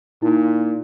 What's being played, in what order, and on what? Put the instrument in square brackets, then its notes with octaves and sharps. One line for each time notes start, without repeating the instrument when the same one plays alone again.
[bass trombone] A#2 [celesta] D#4 E4